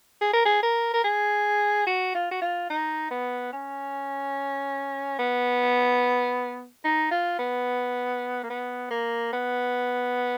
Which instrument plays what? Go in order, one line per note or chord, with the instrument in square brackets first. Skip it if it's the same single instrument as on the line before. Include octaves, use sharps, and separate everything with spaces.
[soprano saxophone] G#4
A#4
G#4
A#4
A#4
G#4
F#4
F4
F#4
F4
D#4
B3
C#4
B3
D#4
F4
B3
A#3
B3
A#3
B3